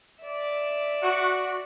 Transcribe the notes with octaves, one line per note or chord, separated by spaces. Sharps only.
D5 E5
F#4